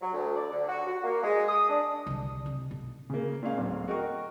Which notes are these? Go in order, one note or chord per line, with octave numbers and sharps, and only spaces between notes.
F#3
D2
D5
D3
F#4
F#4
A#3
G#3
D#6
D4
C2 D3
C3
B1
C#3 A#3
A#2 G#3 C#4 F5
D1
F#4 A#4 D#5 G5 C#6